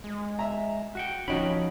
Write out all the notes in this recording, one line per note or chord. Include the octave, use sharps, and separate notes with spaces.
G#3
E5 A#5
F#4 F#5 G5
D1 F3 C#4 D#4 F#4 G5 B5